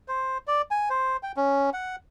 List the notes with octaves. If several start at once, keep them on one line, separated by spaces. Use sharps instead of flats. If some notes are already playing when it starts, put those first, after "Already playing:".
C5
D5
G#5
C5
G5
C#4
F#5